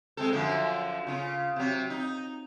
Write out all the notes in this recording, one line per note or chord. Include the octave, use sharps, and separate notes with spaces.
G#3 C4 A4
F#2 D3 F3
C#3 F4
C3 F#3
D#4